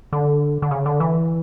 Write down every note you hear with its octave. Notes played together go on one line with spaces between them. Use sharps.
D3
D3
C#3
D3
E3